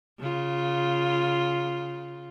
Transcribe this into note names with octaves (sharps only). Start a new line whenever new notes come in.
C#3 F4